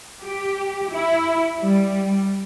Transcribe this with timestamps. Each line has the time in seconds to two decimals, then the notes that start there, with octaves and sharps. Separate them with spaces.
0.22 G4
0.89 E4
1.60 G3